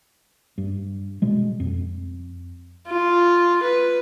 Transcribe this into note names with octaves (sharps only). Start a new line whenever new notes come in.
G2
B2 G3 G#3
F2
F4
B4